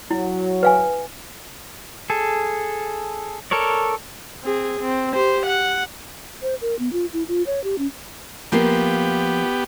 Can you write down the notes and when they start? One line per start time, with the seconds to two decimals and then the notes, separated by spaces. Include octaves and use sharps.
0.11 F#3 E4
0.63 B4 F5 G#5
2.10 G#4 A4
3.51 A4 A#4 C#5 D5
4.44 C4 G#4
4.81 C4
5.14 G4 C5
5.46 F#5
6.42 C5
6.61 A#4
6.79 B3
6.93 F4
7.13 E4
7.28 F4
7.47 C#5
7.64 G4
7.78 C#4
8.52 F3 A#3 B3 F4 G4